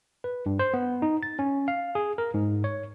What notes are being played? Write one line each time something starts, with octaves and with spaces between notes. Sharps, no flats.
B4
G2
C5
B3
D#4
A6
C#4
F5
G#4
A#4
G#2
C#5